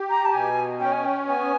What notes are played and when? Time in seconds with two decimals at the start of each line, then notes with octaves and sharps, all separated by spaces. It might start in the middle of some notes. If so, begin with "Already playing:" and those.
Already playing: G4
0.10 A#5
0.25 A5
0.33 B2 G#5
0.80 C#4 G5
0.92 G#5
1.05 G5
1.27 B3 G#5